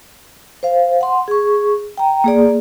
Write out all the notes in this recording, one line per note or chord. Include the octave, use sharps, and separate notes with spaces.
C5 F5
F#5 C6
G#4 C#6
G5 A#5
A#3 G#4 D5